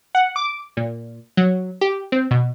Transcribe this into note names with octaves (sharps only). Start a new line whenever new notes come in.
F#5
D6
A#2
F#3
G4
C4
B2